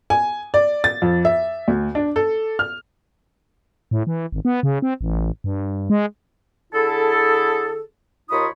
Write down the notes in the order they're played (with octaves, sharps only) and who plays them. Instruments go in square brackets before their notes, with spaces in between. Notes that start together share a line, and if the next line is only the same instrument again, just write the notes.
[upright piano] G#5
D5
A6
F2
E5
D2
D4
A4
F6
[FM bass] A2
E3
G#1
B3
C#3
C4
A1
G2
G#3
[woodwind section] D3 E4 G#4 A4
D#2 D#4 F4 C#5 B5 D#6